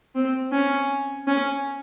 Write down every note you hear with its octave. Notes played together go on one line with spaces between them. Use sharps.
C4
C#4
C#4